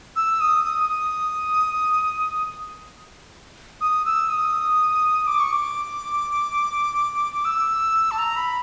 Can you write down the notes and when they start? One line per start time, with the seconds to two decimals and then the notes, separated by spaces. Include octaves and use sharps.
0.16 E6
0.41 D#6
0.65 D#6
0.89 D#6
3.81 D#6
4.05 E6
4.29 D#6
5.27 D6
5.40 C#6
5.52 D6
7.45 E6
8.11 A5
8.18 A#5
8.36 B5